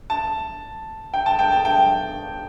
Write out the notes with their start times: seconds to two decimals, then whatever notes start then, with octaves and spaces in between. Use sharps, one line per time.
0.10 A5
1.14 G5
1.26 A5
1.39 G5
1.52 A5
1.65 G5